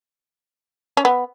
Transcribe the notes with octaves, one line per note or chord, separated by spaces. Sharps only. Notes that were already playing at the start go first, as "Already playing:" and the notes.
C#4
B3